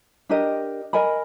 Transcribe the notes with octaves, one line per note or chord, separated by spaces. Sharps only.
D4 G4 A#4 D#5
A#4 D#5 G#5 B5